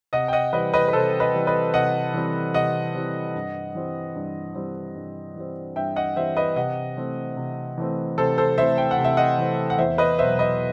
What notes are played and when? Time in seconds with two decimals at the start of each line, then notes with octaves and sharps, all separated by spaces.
0.13 C3 D#5 F#5
0.28 G5
0.33 D#5 F#5
0.53 E3 G3 C4 B4 D#5
0.73 B4 D#5
0.88 B4
0.93 C3 A4 C5
1.20 B4 D#5
1.34 E3 G3 C4
1.47 B4 D#5
1.74 C3 D#5 F#5
2.14 E3 G3 C4
2.54 C3 D#5 F#5
2.94 E3 G3 C4
3.35 G2
3.75 E3 G3 C4
4.15 G2
4.55 E3 G3 C4
4.95 G2
5.36 E3 G3 C4
5.76 G2 E5 G5
5.96 D#5 F#5
6.16 E3 G3 C4 C5 E5
6.37 B4 D#5
6.56 C3 D#5 F#5
6.97 E3 A3 C4
7.37 C3
7.78 E3 A3 C4
8.18 C3 A4 C5
8.38 A4 C5
8.58 E3 A3 C4 C5 E5
8.78 G5
8.91 F#5
8.98 C3
9.04 E5
9.17 D#5 F#5
9.38 E3 A3 C4
9.70 F#5
9.78 E2 C5 E5
9.98 B4 D#5
10.19 B2 F#3 C5 E5
10.39 B4 D#5